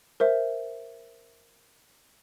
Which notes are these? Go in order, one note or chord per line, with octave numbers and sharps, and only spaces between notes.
A#4 C5 E5